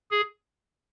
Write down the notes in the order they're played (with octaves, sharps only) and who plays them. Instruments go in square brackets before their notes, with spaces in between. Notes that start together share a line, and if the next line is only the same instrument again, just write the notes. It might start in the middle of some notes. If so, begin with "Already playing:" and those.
[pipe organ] G#4